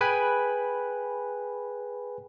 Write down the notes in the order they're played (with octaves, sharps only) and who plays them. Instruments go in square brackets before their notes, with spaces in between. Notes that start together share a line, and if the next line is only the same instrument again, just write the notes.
[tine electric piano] G#4 B4 G5 G#5 B5 F#6